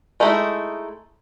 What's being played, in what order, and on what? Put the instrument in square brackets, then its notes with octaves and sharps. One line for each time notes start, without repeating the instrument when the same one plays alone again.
[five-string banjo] G#3 A3 D#4 E4